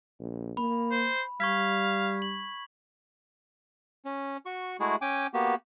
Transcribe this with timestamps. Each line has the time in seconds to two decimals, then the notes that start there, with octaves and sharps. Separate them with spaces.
0.19 A#1
0.57 A#3 B5
0.91 C5
1.40 G3 F5 C#6 G#6 B6
2.22 F#7
4.05 C#4
4.46 F#4 C#6
4.80 G#3 A3 E4 F#4 G#4
5.02 C#4 G5 G#5 D6
5.34 A#3 B3 F#4 G4